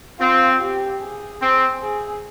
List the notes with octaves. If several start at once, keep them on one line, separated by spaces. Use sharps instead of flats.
C4 F4
G4
G#4
C4
G#4